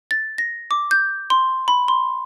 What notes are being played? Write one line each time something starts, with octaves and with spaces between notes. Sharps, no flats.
A6
A#6
D6
G6
C6
B5
C6